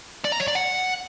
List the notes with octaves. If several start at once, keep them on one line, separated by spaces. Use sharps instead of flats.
D5
A#5
C#5
D5
F#5